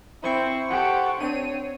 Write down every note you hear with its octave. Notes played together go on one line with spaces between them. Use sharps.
C4 E4 C5 C#6
G4 A4 F#5
C4 D4 C#5 D#7